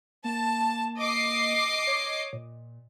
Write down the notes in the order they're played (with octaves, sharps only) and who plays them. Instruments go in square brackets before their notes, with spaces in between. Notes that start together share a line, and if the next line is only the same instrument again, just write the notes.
[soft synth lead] A#3 [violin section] A5
[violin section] D#5 D6 C7
[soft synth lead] C#5
A#2